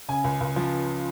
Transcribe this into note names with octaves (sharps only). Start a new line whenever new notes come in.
C#3 G#5
C#2
C#2
F3